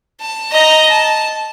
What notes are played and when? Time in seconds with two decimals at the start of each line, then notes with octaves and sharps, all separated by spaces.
0.20 A5
0.51 D#5 A#5
0.90 A5